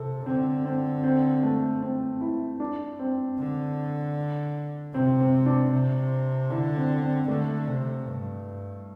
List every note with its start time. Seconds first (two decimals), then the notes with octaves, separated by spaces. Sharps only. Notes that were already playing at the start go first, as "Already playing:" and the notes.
Already playing: C3 A4
0.26 D3 C4
0.65 C4
1.04 C4
1.43 A3
1.82 C4
2.21 E4
2.60 D4
2.99 C4
3.38 D3
4.94 C3 C4
5.20 C4
5.46 D4
5.72 C3
6.50 D3 E4
6.77 C4
7.02 C4
7.28 D3 A3
7.67 C3
8.06 G2